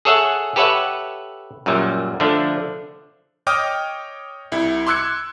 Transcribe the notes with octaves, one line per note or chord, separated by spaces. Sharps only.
G#4 A4 C#5 E5 F#5
G4 A4 B4 C#5 E5 F#5
F#2 A#2 F#3 G3
D3 F3 A3 D4
C#5 D#5 G5 D6 D#6 F6
C2 E4
C6 D6 E6 F#6 G#6 C#7